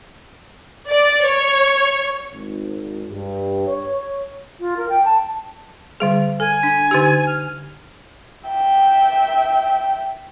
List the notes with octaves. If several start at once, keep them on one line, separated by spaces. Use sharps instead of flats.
D5
C#5
G#1
G2
C#5
F4
A#4
G5
A5
D3 G3 G#4
A4 G#5
D4
D3 D#4 G4
F6
E5 G5